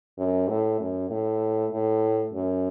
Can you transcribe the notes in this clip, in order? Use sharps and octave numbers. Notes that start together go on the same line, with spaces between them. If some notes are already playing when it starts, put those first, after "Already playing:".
F#2
A2
F#2
A2
A2
F#2